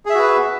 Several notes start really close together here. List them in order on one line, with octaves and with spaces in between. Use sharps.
G#4 E5 F#4 B4